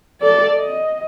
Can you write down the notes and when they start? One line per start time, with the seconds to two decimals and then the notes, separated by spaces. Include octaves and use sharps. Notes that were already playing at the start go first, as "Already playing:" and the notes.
0.21 A4 D5
0.58 D#5